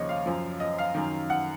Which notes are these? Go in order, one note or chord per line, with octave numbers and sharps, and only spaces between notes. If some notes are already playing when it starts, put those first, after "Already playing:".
Already playing: D#2 C#3 F3 C#5 D#5
F5
F#2 F3
D#5
F5
F#2 D#3
F#5